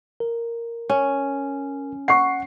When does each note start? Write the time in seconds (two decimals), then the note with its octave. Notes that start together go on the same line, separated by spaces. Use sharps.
0.20 A#4
0.90 C#4
2.08 F#5 C#6 C7